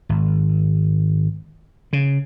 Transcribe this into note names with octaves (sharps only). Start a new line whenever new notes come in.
G#1
C#3